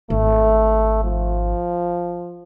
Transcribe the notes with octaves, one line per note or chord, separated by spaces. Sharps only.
G#1 A3
F3